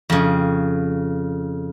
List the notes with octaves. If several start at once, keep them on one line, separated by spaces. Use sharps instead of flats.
F2 C#3